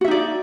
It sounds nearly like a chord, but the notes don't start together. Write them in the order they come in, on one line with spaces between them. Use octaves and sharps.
F#4 E5 D#4 D5